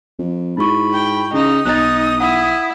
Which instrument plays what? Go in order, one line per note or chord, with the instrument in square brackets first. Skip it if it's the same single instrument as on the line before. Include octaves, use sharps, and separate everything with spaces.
[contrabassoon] F2
[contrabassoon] G#2 [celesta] E4 F#4 C#6 [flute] B5
[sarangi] G5
[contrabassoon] C#3 [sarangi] D#4 [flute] D#6
[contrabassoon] B1 [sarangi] D#4 [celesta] F#6 A6
[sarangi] E4 [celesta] F#5